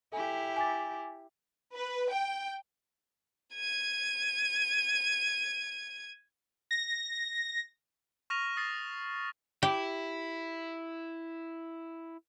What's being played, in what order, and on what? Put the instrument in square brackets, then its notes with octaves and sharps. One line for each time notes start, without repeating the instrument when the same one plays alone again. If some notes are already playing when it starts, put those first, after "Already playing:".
[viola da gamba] E4 G4 [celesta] A4 G#5
[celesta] G#5 D6 A6
[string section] B4
G5
[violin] G#6 D#7
[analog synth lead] A#6
[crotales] C#6 F6 A#6 D#7 F7
D#6 A6 C7
[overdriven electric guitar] E4 [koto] G4